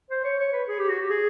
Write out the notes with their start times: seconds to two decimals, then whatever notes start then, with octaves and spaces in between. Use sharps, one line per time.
0.10 C5
0.24 C#5
0.39 C#5
0.53 B4
0.68 G#4
0.79 G4
0.89 F#4
0.99 G4
1.10 G#4